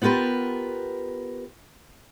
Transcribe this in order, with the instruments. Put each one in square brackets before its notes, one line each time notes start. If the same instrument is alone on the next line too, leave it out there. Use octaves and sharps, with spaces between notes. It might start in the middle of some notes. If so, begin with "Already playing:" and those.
[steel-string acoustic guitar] B3 F4 G4 A#4 B4